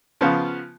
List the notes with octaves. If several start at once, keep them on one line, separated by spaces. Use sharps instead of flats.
C#3 F3 B3 F4